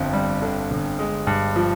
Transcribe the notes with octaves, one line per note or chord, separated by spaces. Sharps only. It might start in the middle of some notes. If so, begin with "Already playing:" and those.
Already playing: G1 F2
G3
D3
G1
G#3
G2
F3